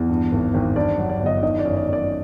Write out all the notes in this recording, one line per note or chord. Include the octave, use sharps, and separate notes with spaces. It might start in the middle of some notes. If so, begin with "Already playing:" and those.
Already playing: E2
G2
G#1
G#1
G2 D5
F#3
D5
G1
D#5
D#3 D#5
D5
F#2
D5
F#2
D5